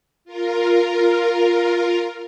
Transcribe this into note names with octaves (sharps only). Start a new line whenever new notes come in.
F4 A#4